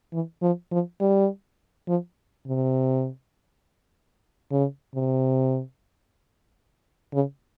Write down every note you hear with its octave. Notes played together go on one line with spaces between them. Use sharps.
E3
F3
F3
G3
F3
C3
C#3
C3
C#3